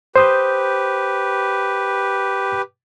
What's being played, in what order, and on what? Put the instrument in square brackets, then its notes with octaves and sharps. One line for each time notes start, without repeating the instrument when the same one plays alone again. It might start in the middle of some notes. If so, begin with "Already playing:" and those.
[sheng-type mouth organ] G4 B4 [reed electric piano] C5 D#6 G6